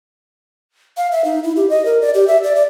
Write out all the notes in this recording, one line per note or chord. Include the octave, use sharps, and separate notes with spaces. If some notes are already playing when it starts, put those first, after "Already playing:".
F5
E5
D#4
E4
G4
D#5
A#4
D5
G4
E5
D5
D5